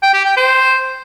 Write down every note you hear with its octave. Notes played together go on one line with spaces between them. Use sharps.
G5
G4
G5
C5